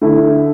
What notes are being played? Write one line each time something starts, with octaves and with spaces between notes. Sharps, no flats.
D3 A3 E4 A4